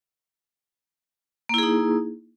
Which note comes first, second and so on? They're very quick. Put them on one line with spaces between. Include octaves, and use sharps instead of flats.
A#3 E4 G#4 D#4